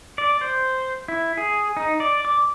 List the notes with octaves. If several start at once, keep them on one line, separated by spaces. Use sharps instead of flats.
D5
C5
E4
G#4
D#4
D5
D6